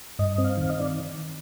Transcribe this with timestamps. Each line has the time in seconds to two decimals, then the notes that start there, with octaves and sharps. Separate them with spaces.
0.19 G2 D#5
0.38 C4
0.44 F5
0.57 D#3
0.70 D#5
0.79 D5